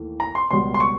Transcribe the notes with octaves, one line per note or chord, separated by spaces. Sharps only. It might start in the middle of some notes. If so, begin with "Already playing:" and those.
Already playing: D#2 E3 A3
A#5
C6
C#2 B2 G3 C6
C6
C#6